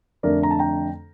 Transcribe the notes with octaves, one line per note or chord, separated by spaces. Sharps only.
F2 D3 A3 D4 A#4 D5
A#5
A5
G5 A#5